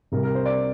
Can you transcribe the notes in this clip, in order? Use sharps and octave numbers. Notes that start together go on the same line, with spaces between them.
C2 C3 G3 A#4
A#4
C5
D5